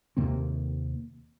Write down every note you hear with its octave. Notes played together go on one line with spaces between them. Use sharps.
D#2 C3 A#3 C4